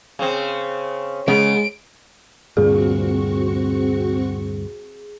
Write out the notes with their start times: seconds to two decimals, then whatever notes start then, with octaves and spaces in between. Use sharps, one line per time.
0.19 C#3 C4
1.28 C#3 G#3 B3 D7
2.57 D2 G2 A#2 C4 F#4 G#4 C#6